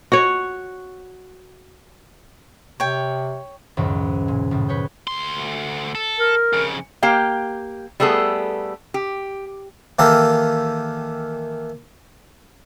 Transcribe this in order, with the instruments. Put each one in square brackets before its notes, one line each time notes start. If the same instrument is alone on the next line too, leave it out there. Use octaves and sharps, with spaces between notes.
[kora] F#4 C#5
[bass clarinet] C3 [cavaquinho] C#5 G5
[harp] C#2 F#2 A2 D#3 F3
A#2
C#2 A2
B4 C#5 G6
[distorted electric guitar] D2 C6
A4
[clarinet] A#4
[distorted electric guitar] F2 C#3
[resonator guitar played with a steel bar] A#3 G4 F5 G5
G3 A3 B3 G#4 A4
G4
[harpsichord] D#3 E3 A#3 G4 A4 A#4